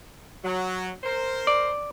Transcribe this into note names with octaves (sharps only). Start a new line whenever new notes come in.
F#3
A#4 C5
D5